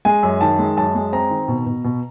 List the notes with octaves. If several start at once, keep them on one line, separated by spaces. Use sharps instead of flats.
G#3 G#5
F#2
D#3 A5
G#3
F#2 A5
G#3
C4 A#5
D#3
B2
B2
B2